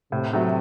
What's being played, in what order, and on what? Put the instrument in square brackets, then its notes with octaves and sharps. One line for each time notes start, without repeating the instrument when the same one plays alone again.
[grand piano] A2 [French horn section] C3
[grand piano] F#3 A3